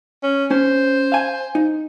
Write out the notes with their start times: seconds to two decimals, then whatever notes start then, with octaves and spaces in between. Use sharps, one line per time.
0.23 C#4
0.51 C#4 C5
1.12 F5 G#5
1.55 D#4